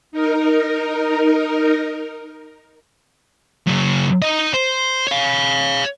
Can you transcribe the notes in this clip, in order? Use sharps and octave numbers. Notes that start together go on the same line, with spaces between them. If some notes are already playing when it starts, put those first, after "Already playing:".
D#4 A#4
F#2 C#3
D#4 D#5
C5
C#5 F5